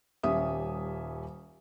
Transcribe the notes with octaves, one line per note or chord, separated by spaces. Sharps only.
D#1 G3 C#4 E5 D#6